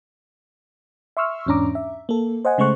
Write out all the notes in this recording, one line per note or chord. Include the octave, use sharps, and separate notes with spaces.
E5 C6 C#6 E6 F6
E2 G#2 C#4 D4 A#5 D6
E5
A#3 A4
C5 D#5 F#5 G#5
C#3 G#3 A3 C5 C#6 F#6